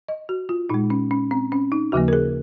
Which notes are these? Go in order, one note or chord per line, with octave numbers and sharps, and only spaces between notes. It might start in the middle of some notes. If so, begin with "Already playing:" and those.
D#5
F#4
F4
A#2 G#3 D#4
C#4
C#4
C4
C#4
D#4
D#2 C#3 F3 A#3 F#4
A#4
G#4